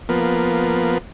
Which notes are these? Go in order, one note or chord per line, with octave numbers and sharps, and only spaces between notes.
F3 A#3 B3